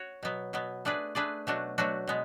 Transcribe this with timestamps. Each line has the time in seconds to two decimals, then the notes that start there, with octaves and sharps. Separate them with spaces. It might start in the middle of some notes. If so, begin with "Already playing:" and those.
Already playing: F#4 C#5
0.23 B2 F#3 B3
0.53 B2 F#3 B3
0.85 A3 D4 G#4 B4 D5
1.15 A3 D4 G#4 B4 D5
1.47 B2 F#3 A3 D4 F#4
1.78 B2 F#3 A3 D4 F#4
2.07 B2 G#3 B3